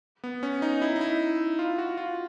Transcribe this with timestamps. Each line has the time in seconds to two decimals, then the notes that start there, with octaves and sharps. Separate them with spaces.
0.24 B3
0.43 C#4
0.62 D#4
0.82 E4
0.96 D#4
1.01 E4
1.59 F4
1.78 F#4
1.97 F4